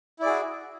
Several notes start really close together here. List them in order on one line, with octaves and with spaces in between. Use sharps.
E4 D5 G#4 F#4